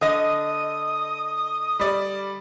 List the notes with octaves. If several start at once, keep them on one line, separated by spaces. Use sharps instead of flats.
D3 D#5 D#6
G3 D5